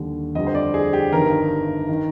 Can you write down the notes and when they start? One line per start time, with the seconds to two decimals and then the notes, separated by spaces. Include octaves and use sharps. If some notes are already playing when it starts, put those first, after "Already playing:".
Already playing: D#2 D3 G3
0.35 F2 D3 G3 D#5
0.47 C5
0.55 D5
0.74 G#4
0.93 G4
1.12 G1 G2 D#3 A#4
1.89 D#3